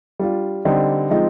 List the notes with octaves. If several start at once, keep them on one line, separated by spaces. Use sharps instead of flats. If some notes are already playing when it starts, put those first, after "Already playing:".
G3 D4 F4
D3 G3 C4 D#4
F3 G#3 C4 D#4